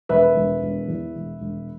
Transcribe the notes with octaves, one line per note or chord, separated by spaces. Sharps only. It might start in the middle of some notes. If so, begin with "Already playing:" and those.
E1 B4 E5
E1
E1
E2
E1
E1